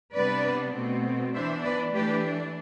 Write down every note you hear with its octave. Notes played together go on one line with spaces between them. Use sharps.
C3 G3 B3 D4 B4 D5
B2 A3 C4
E3 B3 D4 C5 E5
B4 D5
E3 A3 D4 G4 B4